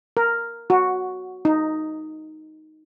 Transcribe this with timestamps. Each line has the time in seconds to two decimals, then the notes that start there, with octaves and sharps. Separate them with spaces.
0.17 A#4
0.70 F#4
1.45 D#4